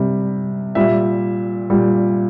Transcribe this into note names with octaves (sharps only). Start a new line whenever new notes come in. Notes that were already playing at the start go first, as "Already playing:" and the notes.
Already playing: C3 G3
A#2 G3 E5
A#2 G3